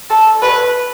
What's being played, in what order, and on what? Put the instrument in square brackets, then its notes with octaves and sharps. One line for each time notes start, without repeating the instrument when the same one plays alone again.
[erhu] A4
B4